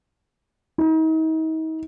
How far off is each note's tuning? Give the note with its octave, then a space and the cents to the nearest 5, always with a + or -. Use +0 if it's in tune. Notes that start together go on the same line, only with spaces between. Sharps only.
D#4 +40